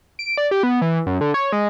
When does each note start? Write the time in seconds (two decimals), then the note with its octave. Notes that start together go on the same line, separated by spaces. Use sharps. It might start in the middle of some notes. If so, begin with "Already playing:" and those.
0.19 D7
0.38 D5
0.51 G4
0.63 B3
0.82 E3
1.06 F#2
1.21 D3
1.34 C#5
1.53 G#3